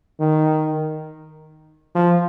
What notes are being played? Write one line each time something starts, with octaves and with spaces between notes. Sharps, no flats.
D#3
F3